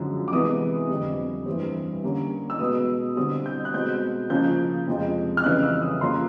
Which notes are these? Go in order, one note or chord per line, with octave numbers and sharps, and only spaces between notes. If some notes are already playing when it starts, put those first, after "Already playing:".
Already playing: F#2 D3 F3 G#3
D6
C3 E3 G#3 B3 D#6
F2 D3 G3
G2 E3 G3 C4
D3 G3 A#3 C#4
E6
B2 G#3 B3 D#6
D3 G3 C4 D#6
G6
F#6
B2 G#3 C4 G6
C#3 F3 A#3 C#4 G6
F2 C3 F3 G#3
F6
F2 C#3 E3 G3 F#6
E6
D#6
C#3 F3 A#3 C6